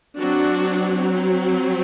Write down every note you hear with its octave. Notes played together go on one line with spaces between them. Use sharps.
F#3 C4 D4 F#4